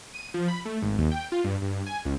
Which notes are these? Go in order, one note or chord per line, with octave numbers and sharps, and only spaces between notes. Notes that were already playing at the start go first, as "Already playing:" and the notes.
D#7
F3
B5
A3
G#1
D#2
G5
F4
G2
G2
G#5
C#2